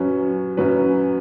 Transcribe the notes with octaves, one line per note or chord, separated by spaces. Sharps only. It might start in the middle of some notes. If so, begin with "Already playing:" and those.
Already playing: F#2 F#3 C#4 B4
F#2 F#3 C#4 B4